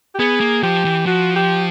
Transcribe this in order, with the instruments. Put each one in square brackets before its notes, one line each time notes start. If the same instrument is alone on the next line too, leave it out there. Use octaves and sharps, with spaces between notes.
[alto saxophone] G4
[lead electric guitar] B3 [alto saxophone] G#4
[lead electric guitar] A#3
[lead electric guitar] F3 [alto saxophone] G4
[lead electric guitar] E3
[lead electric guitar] F3 [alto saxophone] F#4
[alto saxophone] G4